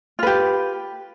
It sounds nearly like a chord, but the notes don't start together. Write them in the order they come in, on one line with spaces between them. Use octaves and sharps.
F4 B4 G4